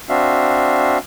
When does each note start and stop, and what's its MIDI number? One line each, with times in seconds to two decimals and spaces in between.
0.09 0.98 60
0.09 0.98 62
0.09 0.98 66
0.09 0.98 76
0.09 0.98 77